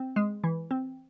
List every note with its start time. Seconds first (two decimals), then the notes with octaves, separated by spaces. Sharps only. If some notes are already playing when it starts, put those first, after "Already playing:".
Already playing: C4
0.16 G#3
0.44 E3
0.71 C4